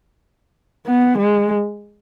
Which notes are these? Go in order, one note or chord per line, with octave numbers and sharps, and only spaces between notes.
B3
G#3